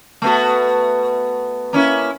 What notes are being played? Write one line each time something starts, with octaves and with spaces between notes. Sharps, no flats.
A3 B3 F#4
A#3 C#4 E4